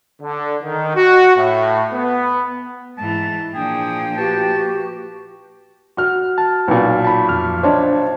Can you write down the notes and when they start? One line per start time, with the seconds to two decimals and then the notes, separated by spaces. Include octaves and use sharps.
0.22 D3
0.63 D#3
0.96 F#4
1.37 A2
1.94 B3
2.98 G#2 E3 A5
3.54 A#2 F3 D4 G#4 G5
4.17 F#4 G4 B4 A5
5.97 F#4 F6
6.38 A5
6.68 B1 A#2
7.05 A5 B5
7.29 F2 F6
7.63 D4 C5 C#5 D#5 A5